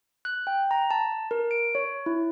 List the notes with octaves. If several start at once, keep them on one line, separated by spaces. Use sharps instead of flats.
F#6
G5
A#5
A5
A#4
D7
C#5
E4